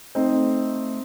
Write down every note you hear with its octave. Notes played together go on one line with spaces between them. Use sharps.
A3 C4 D#4